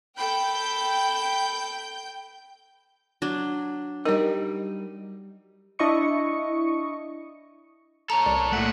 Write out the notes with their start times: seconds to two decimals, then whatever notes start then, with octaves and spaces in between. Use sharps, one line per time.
0.17 A4 G5 B5 G6
3.22 F#3 D4
4.05 G3 D#4 A#4 D#5
5.79 D4 E4 D#5 C#6 C#7
8.10 A4 C#5 A#5
8.26 C2 D5
8.53 A#2 A3 F#5